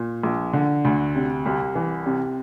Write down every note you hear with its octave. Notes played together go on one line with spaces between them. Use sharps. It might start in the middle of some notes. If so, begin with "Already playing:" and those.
Already playing: A#2
A#1
D3
D2
C3
C2
E3
C3